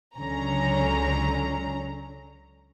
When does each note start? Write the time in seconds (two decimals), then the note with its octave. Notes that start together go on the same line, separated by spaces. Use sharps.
0.18 C#2 D3 F#3 C#4 A#5